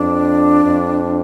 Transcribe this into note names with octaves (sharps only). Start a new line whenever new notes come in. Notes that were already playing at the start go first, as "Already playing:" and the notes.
Already playing: F2 D4
F2